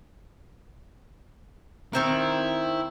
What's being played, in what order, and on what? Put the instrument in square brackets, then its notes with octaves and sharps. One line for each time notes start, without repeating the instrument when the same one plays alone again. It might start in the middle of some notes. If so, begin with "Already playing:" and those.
[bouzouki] D#3 C4 A#4 [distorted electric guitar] E4